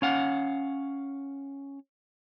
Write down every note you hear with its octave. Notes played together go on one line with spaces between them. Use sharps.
C#4 F5 F#5